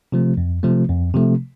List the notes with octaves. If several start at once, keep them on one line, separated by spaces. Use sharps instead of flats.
C3 F3 A3
F2
C3 F3 A3
F2
C3 F3 A3